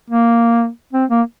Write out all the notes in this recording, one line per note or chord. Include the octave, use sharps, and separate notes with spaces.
A#3
C4
A#3